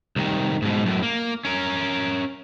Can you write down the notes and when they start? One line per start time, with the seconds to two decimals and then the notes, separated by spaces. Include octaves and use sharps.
0.16 C2 D#3
0.62 G#2 B2
0.86 F#2 A2
1.03 A#3
1.45 C#4 A#4